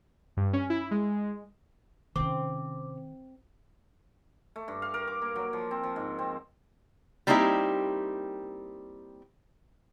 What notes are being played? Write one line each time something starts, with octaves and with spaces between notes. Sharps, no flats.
G2
C#4
E4
G#3
C3 D#3 C4 C#4 D6
A3
G2
F5
A#4
D6
A#3
F#3
F3
C4
F3
G#2
C4
G3 A#3 C4 D#4 E4 G4